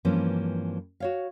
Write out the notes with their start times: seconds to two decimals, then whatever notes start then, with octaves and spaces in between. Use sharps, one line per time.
0.05 G2 E3 F3 A#3 C4 C#4
1.00 F#4 C#5 F5